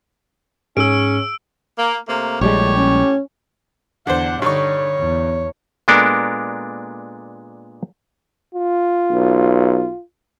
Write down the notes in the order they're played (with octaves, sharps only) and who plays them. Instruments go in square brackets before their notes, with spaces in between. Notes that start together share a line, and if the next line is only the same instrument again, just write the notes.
[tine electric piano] G#2 [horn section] C#4 [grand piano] G#4 [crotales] E6 D7
[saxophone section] A#3
C3 A3 A#3
[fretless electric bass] A#1 G3 G#3 [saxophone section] A2 G4 C#5
[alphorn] C#4
[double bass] E2 [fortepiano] D3 D4 C5 [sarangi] F#5
[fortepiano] G2 D#4 C#6 [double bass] D3 [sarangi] C#5
[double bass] E2
[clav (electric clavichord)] A#2 G#3 B3 D4 A4 A#4
[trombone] F4
[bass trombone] B1